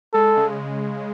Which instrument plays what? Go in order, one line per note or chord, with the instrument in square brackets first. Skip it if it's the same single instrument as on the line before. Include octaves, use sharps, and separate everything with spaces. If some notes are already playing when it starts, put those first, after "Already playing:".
[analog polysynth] G#3 [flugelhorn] A4
[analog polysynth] C#3